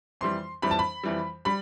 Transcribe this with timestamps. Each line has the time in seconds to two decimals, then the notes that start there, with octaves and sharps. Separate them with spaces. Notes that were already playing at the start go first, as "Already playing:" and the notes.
0.21 F2 E3 G3 C6
0.62 F2 E3 G3 B5
0.71 A5
0.79 B5
1.04 F2 E3 G3
1.45 G3 B5